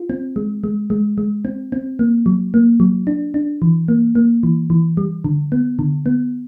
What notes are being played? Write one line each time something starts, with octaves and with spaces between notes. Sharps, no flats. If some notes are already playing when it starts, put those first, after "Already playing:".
Already playing: F4
C4
G#3
G#3
G#3
G#3
C4
C4
A#3
F#3
A#3
F#3
D4
D4
E3
A#3
A#3
E3
E3
G3
D3
B3
D3
B3